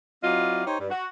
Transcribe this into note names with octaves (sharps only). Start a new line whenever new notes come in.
F#3 C4 E4 F4 D5 D#5
D#4 G4 C5 C#5
G2
F#4